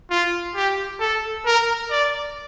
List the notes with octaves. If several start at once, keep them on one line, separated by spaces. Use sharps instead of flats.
F4
G4
A4
A#4
D5